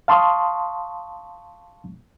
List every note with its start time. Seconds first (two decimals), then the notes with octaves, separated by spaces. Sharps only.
0.08 F5 A5 C6 C#6 D#6